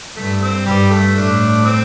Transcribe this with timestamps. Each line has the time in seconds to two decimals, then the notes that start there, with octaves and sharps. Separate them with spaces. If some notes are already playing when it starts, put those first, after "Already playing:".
0.17 G2 A3
0.42 C4
0.66 G2 G3
0.91 A3
1.16 A2 A3 D4
1.64 C4